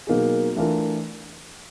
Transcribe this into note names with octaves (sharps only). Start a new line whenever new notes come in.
B2 F#3 A#3 D#4 G#4
E3 A3 D4 F4 A#4